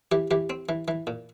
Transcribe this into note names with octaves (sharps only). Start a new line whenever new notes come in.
E3 G4
E3 G4
C4
E3
E3
A#2